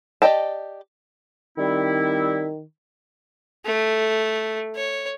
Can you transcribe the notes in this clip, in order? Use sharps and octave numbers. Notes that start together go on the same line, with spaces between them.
G4 D5 D#5 G5 A5
D#3 G3 C4 E4
A3
C#5